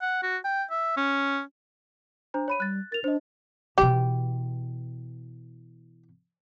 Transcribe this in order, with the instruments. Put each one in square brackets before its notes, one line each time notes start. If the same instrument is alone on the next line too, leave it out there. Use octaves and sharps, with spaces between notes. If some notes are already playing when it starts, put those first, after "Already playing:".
[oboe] F#5
F#4
G5
E5
C#4
[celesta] D4 C5 A#5
C#5 B5 D#7
[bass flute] G3 [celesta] F#6 A6
[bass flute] A#4 [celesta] A6 F7
[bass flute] D4 [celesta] C5 D#5
[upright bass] B2 E3 [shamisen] G4